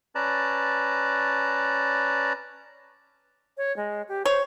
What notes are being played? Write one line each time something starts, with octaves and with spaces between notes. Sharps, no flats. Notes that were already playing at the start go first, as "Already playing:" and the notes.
C#4 B4 D5 A5 A#5
C#5
G#3
G4
C5 C#5